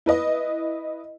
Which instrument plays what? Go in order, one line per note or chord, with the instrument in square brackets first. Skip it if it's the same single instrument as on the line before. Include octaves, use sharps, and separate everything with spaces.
[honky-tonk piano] E4 B4 D#5